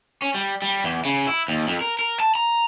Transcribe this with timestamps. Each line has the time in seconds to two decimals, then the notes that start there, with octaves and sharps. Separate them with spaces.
0.22 C#4
0.34 G3
0.62 G3
0.84 E2
1.05 C#3
1.27 E4
1.48 D#2
1.68 F2
1.81 A#4
1.99 A#4
2.20 A5
2.35 A#5